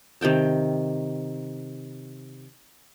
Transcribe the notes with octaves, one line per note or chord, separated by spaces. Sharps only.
C3 D#3 G5 A5